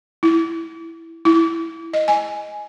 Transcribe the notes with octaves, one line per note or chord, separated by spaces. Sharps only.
E4
E4
D#5
G#5